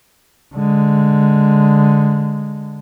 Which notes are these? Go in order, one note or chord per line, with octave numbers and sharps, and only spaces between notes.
D3 G#3